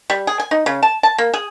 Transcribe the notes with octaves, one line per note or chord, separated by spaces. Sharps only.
G3
G#4
G#5
D#4
C#3
A5
A5
A#3
G#4